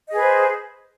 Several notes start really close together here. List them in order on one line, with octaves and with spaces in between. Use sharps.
D#5 G#4 B4 C5